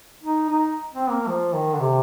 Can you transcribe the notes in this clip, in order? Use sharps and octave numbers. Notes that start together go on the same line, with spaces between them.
D#4
D#4
C4
A#3
F3
D#3
D3
C3